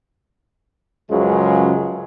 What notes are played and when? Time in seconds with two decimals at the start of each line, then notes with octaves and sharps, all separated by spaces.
1.10 C#2 F#2 C#3 F3 F#3 G#3